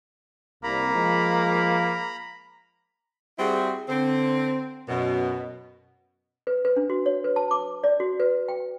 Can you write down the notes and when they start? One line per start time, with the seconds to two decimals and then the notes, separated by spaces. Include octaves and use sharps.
0.63 C2 A#3 A#5 B5
0.94 F3 G#3
3.38 G3 C4 E4 F#4 G#4
3.88 D3 C4
4.88 F#2 B2
6.47 B4
6.65 B4
6.76 D4
6.90 F#4
7.06 C#5
7.24 B4
7.36 A5
7.51 D6
7.84 D5
8.00 F#4
8.20 B4
8.48 G5